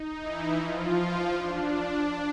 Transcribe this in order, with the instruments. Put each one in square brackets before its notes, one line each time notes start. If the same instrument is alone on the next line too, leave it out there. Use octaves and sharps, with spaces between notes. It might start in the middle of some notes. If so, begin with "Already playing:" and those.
Already playing: [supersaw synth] D#4
E3 E4
F3 F4
D4